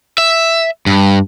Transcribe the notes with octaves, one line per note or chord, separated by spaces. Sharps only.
E5
G2